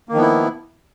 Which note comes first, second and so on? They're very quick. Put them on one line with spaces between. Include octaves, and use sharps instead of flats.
A#3 D#3 F3 B3 E4